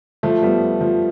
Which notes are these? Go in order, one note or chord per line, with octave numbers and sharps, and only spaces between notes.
F3 A3
G3 B3
F3